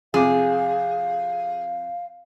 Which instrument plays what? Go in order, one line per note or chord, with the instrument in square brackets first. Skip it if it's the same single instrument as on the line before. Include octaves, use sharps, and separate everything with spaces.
[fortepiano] F2 C3 D6 [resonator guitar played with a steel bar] G#4 [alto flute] F5